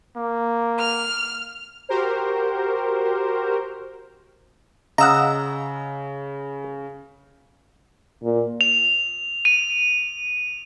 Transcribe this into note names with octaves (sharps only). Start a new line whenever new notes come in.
A#3
F6
F#4 G4 A#4 C5
C#3 D#5 F5 F#5 A#5 E6
A#2
F7
D#7